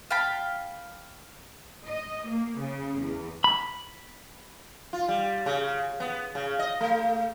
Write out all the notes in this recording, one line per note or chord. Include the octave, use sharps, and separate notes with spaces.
F5 G5 A5 B5
D#5
A#3
C#3
E2
B5
F4
G3
C#3
B3
C#3
D#5
A3